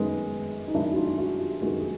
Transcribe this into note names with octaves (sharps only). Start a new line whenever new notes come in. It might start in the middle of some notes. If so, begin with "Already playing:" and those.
Already playing: F#2 D#3 G#3 B3
D#4
F#2 D#3 G#3 B3 D4 E4
F#4
D#4 F4
E4 F#4
F4 G4
F#2 D#3 G#3 B3 F#4 G#4
G#4